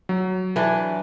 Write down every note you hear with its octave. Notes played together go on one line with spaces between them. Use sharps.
F#3
E3 D4